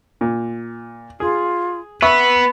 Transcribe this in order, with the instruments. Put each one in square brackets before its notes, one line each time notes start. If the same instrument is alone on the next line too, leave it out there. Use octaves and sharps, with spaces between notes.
[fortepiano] A#2
[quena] F4 [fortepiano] G#4
[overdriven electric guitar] B3 [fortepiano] E5 C#6 [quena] B5